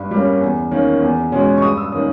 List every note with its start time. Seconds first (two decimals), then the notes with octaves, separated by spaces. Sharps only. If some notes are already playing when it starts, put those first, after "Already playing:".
Already playing: G2
0.11 G3 A#3 C#4
0.41 E2
0.71 D#3 A#3 C#4
1.02 E2
1.32 B2 G#3 C#4
1.58 C#6
1.62 G2 D#6
1.77 E6
1.92 D#3 A#3 C#4 D#6